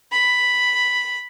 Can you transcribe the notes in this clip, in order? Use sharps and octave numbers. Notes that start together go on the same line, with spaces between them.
B5